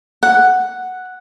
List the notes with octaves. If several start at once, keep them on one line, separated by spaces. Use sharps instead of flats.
F#5